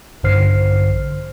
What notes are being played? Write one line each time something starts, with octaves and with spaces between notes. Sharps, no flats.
A#1 G2 D3 C5 F6 C7